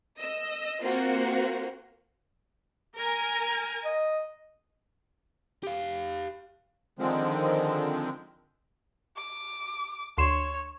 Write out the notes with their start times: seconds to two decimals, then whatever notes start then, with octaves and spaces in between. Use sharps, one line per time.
0.19 D#5 E6
0.81 A#3 C4 F4 F#4
2.96 A#4 G#5
3.85 D#5
5.63 G4 F5
6.99 D3 D#3 F3 G#3 C4
9.17 D6
10.18 D2 C#5 C6 E7